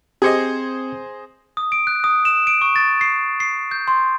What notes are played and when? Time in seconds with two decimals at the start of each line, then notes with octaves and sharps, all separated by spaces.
0.22 C4 G4 G#4 C5 D#5 G#6 C#7
1.57 D#6
1.72 D7
1.87 F#6
2.04 D#6
2.25 E7
2.47 D7
2.62 C#6
2.76 A6
3.01 C7
3.40 C7
3.71 G6
3.88 C6